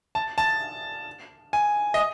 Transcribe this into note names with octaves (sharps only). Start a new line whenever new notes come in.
A5
A5
G#5
D#5